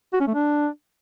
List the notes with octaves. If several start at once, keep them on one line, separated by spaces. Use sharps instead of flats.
F#4
C#4
A3
D4